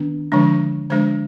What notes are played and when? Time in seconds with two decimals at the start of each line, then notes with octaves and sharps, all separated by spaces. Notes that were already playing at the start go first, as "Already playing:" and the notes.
Already playing: D#3 B3 D4
0.32 D3 F3 G#3 D4
0.90 D3 F3 G#3 D4 C5